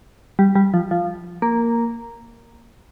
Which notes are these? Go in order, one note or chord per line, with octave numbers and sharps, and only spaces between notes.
G3
G3
F3
F3
A#3